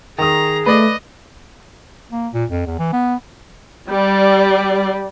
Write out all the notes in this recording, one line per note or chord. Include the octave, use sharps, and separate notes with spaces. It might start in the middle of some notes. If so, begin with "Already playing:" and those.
D#3 G#4 A#5 D#6
A3 B4 D5 D#5
A#3
A#2
F2
E2
E3
B3
G3 D5